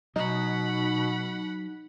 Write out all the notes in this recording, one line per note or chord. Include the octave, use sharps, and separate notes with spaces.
B2 F#3 D#4 F#5 B5